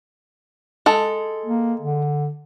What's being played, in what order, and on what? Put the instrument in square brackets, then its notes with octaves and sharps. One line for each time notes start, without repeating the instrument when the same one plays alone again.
[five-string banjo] G#3 A4
[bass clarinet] A#3
D3